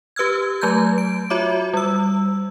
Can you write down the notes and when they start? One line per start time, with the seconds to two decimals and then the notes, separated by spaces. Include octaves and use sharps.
0.16 G4 B4 E6 F6 G#6
0.61 F#3 A3 A#5 G6 G#6
0.98 D7
1.30 F4 F#4 C#5 E5 D6
1.74 G3 E6